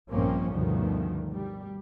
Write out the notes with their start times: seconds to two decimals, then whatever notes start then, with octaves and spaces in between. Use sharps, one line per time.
0.12 A#1 G2 F3 A#3 C4 C#4
0.51 D2 G2 B2 D#3 F3
1.31 G3